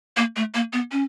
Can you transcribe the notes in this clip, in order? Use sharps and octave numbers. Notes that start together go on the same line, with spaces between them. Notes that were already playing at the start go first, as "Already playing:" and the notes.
A#3
A3
A#3
B3
C#4